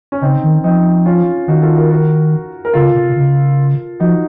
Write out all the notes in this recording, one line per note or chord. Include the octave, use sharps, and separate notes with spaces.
C#4
C#3 C4 D#4
D#3
F3 C4 D#4
C#4 F4
D#3 D#4 F#4
F4 A4
F#4 A#4
F#4 A#4
A#4
C#3 F4 A4
C3
C#3
F3 D#4 F#4